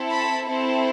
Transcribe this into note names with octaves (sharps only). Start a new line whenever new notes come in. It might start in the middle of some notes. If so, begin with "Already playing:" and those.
Already playing: C4 E4 A4
A5 B5
C4 E4 A4